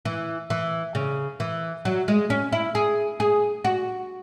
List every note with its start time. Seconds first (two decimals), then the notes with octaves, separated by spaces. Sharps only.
0.05 E3
0.50 E3
0.95 C#3
1.40 E3
1.85 F#3
2.08 G#3
2.30 C#4
2.53 E4
2.75 G#4
3.20 G#4
3.65 F#4